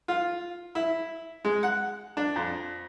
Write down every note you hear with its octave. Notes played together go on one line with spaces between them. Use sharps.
F4
E4
G#3
F#5
D4
F2